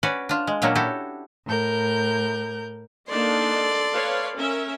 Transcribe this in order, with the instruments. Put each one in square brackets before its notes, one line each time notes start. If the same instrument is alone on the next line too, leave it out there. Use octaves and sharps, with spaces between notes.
[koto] C#4 F#4 B4 D5
D4 F4
G#3
A#2 F#3 A#3 C#4 D4 F#4
E4 F#4 G4 A4
[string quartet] A2 A#4 G6
[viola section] A#3 D4 D#4 [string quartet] A4 D5 C6
[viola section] B4 C#5 F5
C#4 A#4 E5